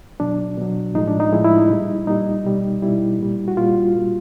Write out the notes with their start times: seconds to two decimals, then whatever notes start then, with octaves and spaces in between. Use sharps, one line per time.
0.20 B2 F#3 D4
0.58 B2 F#3
0.95 A2 F3 G#3 D#4
1.07 D4
1.20 D#4
1.33 A2 F3 G#3 E4
1.44 E4
1.58 D#4
1.70 A#2 G3
2.07 A#2 G3 D#4
2.45 B2 G3
2.82 B2 G3 E4
3.20 A#2 G3
3.48 F#4
3.57 A#2 G3 F4
3.95 A#2 G3